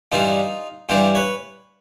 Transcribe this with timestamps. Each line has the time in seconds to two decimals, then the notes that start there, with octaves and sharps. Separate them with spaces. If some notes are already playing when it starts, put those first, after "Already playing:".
0.12 G2 E3 G3 D#4 F4
0.89 G2 E3 G3 F4 G4
1.15 B4 C#5